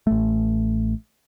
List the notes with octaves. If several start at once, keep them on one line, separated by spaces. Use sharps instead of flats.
A1 A3